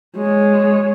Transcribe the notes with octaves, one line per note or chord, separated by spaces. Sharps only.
G#3 C#5